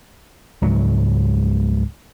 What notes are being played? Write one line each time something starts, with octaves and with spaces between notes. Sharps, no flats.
C#2 G#2 F#3